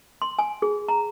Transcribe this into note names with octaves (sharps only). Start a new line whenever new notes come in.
C6
G#5
G#4
A#5